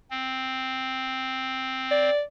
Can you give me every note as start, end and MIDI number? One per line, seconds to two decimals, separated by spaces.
0.10 2.10 60
1.91 2.22 74